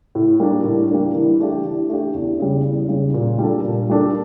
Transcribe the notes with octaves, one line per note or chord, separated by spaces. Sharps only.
A2
G3 A#3 D4
A2
G3 A#3 D4
E3
A3 D4 G4
E3
A3 D4 G4
E2
C#3 G3
E2
C#3 G3
A#2
G3 A#3 D4 A4
A#2
G3 A#3 D4 A4